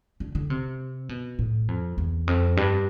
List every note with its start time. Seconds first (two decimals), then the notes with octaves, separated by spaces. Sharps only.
0.20 D3
0.35 D3
0.50 C3
1.09 B2
1.39 A2
1.68 F2
1.98 E2
2.27 F2
2.57 G2